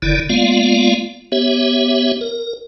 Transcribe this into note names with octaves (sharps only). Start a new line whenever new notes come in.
F#1 D3 D#3 E4 D5
G#3 A#3 B3 F4 D5 F5
B3 G4 C#5 E5
A#4